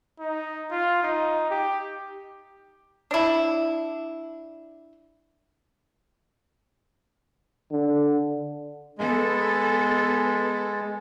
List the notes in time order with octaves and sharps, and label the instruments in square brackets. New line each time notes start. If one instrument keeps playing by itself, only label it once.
[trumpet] D#4
F4
D#4
G4
[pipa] D4 E4
[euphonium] D3
[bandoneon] G#3 [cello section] B3 A4